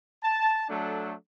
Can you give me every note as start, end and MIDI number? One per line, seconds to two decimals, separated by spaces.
0.23 0.67 81
0.69 1.14 54
0.69 1.14 57
0.69 1.14 62
0.69 1.14 69